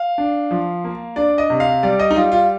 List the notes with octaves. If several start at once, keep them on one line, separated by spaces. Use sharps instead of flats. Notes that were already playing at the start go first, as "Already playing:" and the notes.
Already playing: F5
D4
F3
A#3
D4 D5
D#5
C3
F5
G3 D5
D#5
D#4
G3 F4
F4